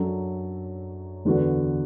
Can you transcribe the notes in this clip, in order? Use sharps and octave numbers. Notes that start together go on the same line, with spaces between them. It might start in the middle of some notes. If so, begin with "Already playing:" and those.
Already playing: F#2 F#3 D4 A4
E2 D3 B3 F#4